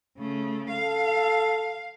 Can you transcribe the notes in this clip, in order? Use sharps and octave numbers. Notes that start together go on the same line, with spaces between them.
C#3 A3
A4 F5